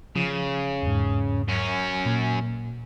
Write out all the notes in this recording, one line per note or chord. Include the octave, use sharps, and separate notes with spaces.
C#3 F3
E2 G#2
F#2 C#4
A#2